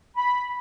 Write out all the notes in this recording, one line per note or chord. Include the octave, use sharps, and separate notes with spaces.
B5